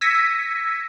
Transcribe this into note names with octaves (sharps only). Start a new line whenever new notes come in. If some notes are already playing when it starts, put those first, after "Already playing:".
E6 G#6 A#6 B6 C#7 D#7